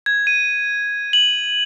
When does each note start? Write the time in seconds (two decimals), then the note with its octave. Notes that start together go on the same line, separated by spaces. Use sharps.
0.06 G#6
0.27 D#7
1.13 F#7